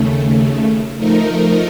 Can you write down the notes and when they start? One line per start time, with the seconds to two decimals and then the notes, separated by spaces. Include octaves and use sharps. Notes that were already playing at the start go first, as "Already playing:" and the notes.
Already playing: D#2 C#3 A3
0.97 F3 A3 D#4 A#4